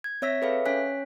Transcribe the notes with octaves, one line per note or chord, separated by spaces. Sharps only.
G#6
C4 C#5 E5 E6 A#6 B6
G#4 A4 B4 C#5 E5 F5
C#4 C#5 G#5 F#6 B6